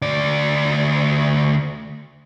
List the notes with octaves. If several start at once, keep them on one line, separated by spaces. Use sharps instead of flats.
D2 D5